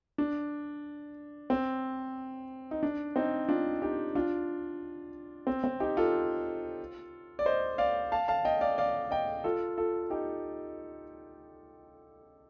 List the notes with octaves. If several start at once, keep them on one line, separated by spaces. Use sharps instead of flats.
D4
C4
D#4
D4
C4 D#4
D4 F4
D#4 G4
D4 F4
C4
C4
D#4 G4
F4 A4
D5
C5 D#5
D5 F5
F5 A5
F5 A5
D#5 G5
D5 F5
D5 F5
D#5 G5
F4 A4
F4 A4
D#4 G4